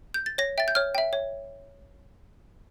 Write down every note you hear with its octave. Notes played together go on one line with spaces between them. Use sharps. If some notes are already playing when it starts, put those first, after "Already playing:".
G6
A6
C#5 A#6
E5 G5 A6
G6
C#5 F6
E5 G5
C#5